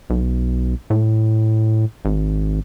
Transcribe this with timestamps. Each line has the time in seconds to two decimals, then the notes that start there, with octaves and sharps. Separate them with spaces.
0.10 B1
0.90 A2
2.05 G#1